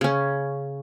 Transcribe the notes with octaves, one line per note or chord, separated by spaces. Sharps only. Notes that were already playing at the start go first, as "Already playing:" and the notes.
C#3 C#4